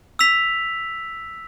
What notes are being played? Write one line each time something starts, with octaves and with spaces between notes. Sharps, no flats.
E6 B6 F7